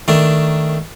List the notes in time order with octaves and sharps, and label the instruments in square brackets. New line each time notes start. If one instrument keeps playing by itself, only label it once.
[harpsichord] D#3 A3 D4